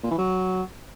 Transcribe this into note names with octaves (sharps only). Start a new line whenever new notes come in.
A#2
E3
F#3